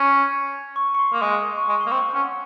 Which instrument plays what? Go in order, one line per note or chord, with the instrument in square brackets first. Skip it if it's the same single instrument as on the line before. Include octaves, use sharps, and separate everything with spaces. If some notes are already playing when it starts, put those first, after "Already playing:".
Already playing: [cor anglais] C#4
[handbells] C#6
C#6
C6
[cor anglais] A#3
[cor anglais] G#3 [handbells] C#6
[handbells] C6
C6
C#6
[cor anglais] G#3 [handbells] C#6
[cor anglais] A#3 [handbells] C6
[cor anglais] C4 [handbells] C#6
[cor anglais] C#4 [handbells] F#5